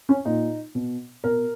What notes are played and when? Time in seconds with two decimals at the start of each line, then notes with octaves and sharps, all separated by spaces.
0.09 C#4
0.25 A#2 D#4
0.75 B2
1.24 B2 A#4